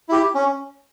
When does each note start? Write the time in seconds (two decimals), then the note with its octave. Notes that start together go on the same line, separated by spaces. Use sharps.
0.09 E4 G4
0.35 C#4